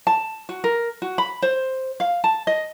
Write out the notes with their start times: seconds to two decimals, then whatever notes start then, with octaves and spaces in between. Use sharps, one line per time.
0.07 A5
0.49 F#4
0.64 A#4
1.02 F#4
1.18 B5
1.42 C5
2.00 F5
2.24 A5
2.47 D#5